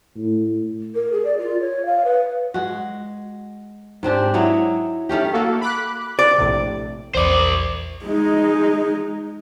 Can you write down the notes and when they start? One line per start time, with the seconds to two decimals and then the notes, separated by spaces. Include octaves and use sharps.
0.16 A2
0.95 A#4
1.12 G#4
1.25 D5
1.38 F4
1.61 C#5
1.86 F5
2.04 B4
2.54 G#3 F#4
4.03 G#2 C4 D4 G4
4.34 F#3 E4 C#5 D#5
5.09 D#3 A3 C#4 G4
5.33 A#3 F#4 A4
5.61 B5 D6 F#6
6.19 D5
6.38 A#1 A2 C3
7.15 A#1 E2 C5 D5 D6
8.06 G#3 D#4